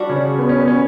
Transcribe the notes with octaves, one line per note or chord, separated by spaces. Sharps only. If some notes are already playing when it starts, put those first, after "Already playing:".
Already playing: G3 D4 F#4
C#3 C#4
B3
C#4
B3
C#4